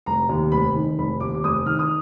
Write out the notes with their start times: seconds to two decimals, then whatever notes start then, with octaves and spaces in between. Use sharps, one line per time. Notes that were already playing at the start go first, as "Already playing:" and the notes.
0.06 F1 A#5
0.29 D#2
0.52 F1 B5
0.74 D#3
0.98 F1 B5
1.20 D#2 D6
1.34 D6
1.44 F1 D#6
1.66 D#3 F6
1.79 D#6